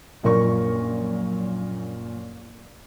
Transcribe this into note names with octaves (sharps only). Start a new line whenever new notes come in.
A#1 F#2 A#2 A#4 D5 C#6